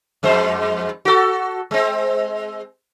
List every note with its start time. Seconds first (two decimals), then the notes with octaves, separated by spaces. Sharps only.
0.23 F2 G#3 C5
1.05 F#4 A4
1.71 G#3 C4